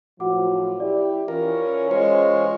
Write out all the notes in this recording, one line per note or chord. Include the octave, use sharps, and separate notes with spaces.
F#2 A2 F3 F#4 F#5 D6
E4 G4 D5
E3 C#4 F4 A#4
G#3 F4 C5 C#5 G#5